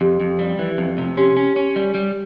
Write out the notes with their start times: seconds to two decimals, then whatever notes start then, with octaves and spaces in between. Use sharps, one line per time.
0.01 F2 G4
0.20 F2
0.39 G3
0.59 E3
0.78 F2
0.98 C3
1.17 C#4 G4
1.37 C#4
1.56 C#4
1.76 G3
1.95 G3